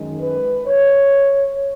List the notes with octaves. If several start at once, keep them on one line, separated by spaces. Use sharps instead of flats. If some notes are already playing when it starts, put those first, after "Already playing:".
Already playing: F#2 D#3 G#3
B4
C#5